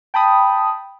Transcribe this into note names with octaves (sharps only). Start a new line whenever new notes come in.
G5 A5 B5 D#6